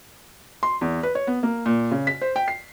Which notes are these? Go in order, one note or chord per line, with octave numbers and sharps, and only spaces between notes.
C6
E2
B4
C#5
B3
A#3
A#2
C#3
B6
C5
G5
C7